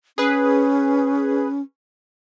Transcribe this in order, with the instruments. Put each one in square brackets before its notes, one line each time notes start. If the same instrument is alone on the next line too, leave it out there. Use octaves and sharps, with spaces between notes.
[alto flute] C#4 [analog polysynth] G#4 B4